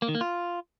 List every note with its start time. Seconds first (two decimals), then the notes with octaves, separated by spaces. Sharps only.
0.02 A#3
0.08 D#3
0.15 A#3
0.21 F4